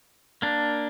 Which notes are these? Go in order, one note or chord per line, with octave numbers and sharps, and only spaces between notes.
A#3 D4